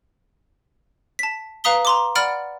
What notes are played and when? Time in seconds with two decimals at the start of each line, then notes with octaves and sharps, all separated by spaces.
1.19 A5 B6
1.64 B4 F5 A#5 D#6 B6 G7
1.85 A#5 C6 D6
2.15 D5 F#5 B5 F6 A6 D7